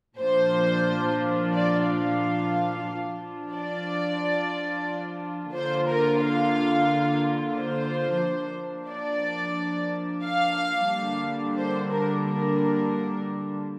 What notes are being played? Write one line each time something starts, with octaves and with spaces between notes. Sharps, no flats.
A#2 F3 D4 F4 C5
D5
F5
F3 D4 F4
D5
D3 A#3 F4 C5
A#4
F5
C5
F3 A#3 D4
D5
F5
D3 G3 A#3 D4
C5
A#4
A#4